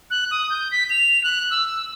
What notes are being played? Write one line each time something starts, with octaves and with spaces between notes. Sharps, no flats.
F#6
D#6
G6
B6
F7
F#6
E6